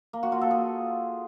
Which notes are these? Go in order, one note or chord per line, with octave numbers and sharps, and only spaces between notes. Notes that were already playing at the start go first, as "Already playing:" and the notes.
A#3
F#4
F4
A4
G#4